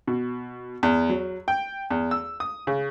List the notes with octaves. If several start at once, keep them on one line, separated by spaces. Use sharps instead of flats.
B2
E2
F#3
G5
E2
E6
D#6
C#3